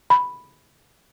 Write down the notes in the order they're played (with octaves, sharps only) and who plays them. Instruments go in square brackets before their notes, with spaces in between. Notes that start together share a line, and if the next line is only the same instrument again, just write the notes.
[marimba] B5